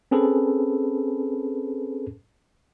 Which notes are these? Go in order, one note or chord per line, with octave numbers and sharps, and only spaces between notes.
C4 C#4 G#4 A4 B4